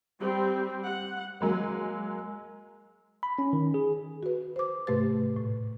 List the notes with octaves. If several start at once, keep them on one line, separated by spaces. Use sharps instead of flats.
G3 C4
F#5
F#3 G#3 A#3
B5
C#4
D#3
G#4
F#4 B4
C5 D6
G#2 C3 A3 G4 B4 A6
A2